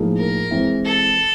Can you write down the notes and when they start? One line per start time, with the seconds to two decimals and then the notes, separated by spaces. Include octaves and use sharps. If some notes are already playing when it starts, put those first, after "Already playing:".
Already playing: A2 F3 A#3 D#4 G#4
0.17 A#4
0.51 E3 G#3 C4 E4
0.85 A4